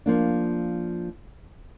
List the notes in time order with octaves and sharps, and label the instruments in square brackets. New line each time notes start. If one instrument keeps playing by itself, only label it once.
[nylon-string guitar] F3 A#3 D4